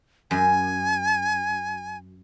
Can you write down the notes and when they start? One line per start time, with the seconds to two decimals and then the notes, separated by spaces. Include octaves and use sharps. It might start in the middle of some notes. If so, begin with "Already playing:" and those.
0.31 F#2 G#5